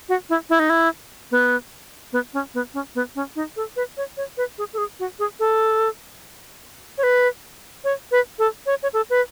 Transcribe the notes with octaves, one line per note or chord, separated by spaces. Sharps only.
F#4
E4
E4
D#4
E4
B3
B3
C#4
B3
C#4
B3
C#4
D#4
A4
B4
C#5
C#5
B4
G#4
A4
G#4
F#4
G#4
A4
C#5
B4
C#5
B4
A4
C#5
C#5
A4
B4